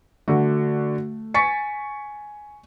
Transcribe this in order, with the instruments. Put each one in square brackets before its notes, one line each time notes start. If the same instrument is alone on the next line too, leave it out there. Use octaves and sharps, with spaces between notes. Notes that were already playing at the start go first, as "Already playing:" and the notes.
[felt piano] D3 F#4 [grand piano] A3
[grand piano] G#5 C#7 [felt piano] C#6 A6 B6